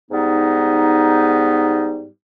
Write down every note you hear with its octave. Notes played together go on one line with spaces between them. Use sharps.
G#2 G3 B3 D#4